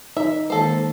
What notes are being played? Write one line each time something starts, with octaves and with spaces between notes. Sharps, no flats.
D#4 E5
D#3 G#3 A#3 A4 C5